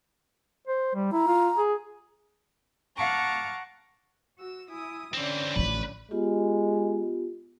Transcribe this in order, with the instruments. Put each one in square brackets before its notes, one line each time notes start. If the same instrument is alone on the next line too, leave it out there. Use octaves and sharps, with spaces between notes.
[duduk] C5
G3
[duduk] E4 [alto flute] A#5
[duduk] F4
G#4
[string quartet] F5 F#5 A5 A#5 C#6 D6
F#4 E6
E4 G#5 D#6
[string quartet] D3 C#4 D5 [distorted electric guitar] E3 C4
[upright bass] A1 F3 [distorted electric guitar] B4
[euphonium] G#3 [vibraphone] B3 F4 G4